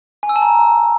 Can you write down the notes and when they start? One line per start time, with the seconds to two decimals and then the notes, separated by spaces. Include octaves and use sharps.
0.23 G#5
0.29 E6
0.36 A5
0.42 A#5